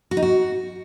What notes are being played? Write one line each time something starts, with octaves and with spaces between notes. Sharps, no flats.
F#4
D#4
F#4